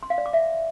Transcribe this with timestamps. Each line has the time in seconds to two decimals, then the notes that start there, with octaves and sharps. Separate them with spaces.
0.03 C6
0.10 F5
0.18 D5
0.26 D6
0.33 E5